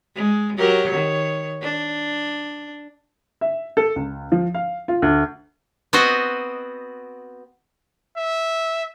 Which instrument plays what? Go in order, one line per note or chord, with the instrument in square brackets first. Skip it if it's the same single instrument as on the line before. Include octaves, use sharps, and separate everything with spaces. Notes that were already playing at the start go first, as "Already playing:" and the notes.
[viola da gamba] G#3
F#3 G4 A#4
D#3 C#5
D4
[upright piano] E5
A4
C#2
F3
F5
F4
D2
[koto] B3 C4 F#4 C5 D#5
[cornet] E5